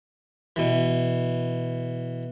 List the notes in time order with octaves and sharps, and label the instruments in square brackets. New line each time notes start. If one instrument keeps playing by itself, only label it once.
[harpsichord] B2 E3